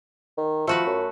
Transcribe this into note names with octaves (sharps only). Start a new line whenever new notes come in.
D#3
F3 A3 F#4 B4
F#2